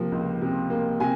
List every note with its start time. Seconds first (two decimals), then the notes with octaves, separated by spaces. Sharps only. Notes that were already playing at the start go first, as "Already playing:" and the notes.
Already playing: C3 F3 A#3
0.12 C#2
0.42 C3
0.70 A#3
1.00 C3 G#5